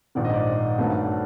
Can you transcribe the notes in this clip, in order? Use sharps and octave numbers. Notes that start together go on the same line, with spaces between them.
A#1 G#2 D#3 D5
D#5
C5 D5
G2 D#3 F#3 A3